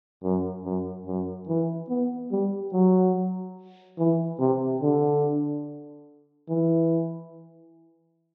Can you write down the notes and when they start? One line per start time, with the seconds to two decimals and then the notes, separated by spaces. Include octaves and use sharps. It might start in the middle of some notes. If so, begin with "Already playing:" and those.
0.23 F#2
0.65 F#2
1.06 F#2
1.48 E3
1.89 B3
2.32 G3
2.73 F#3
3.98 E3
4.40 C3
4.82 D3
6.49 E3